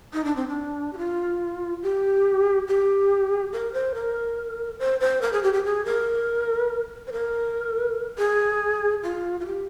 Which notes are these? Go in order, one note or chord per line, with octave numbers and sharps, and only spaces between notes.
D#4
D4
C4
D4
G4
F4
G4
G4
A#4
C5
A#4
C5
C5
A#4
G#4
G4
G4
G#4
A#4
C5
A#4
G#4
F4
F4
G4